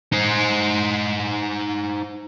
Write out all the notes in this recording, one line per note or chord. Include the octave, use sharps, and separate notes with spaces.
D#4 C5